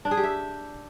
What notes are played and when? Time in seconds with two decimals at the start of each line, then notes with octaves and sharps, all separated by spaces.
0.05 D4
0.11 G#4
0.17 G4
0.23 E5